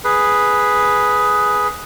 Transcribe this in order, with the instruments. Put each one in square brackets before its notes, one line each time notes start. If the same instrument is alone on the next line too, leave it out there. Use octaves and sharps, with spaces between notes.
[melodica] G#4 B4